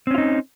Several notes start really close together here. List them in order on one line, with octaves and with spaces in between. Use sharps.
C4 C#4 F4 D#4